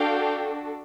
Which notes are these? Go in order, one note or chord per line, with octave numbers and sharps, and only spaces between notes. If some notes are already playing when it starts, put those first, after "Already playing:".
Already playing: D4 F#4 A4 F5 G5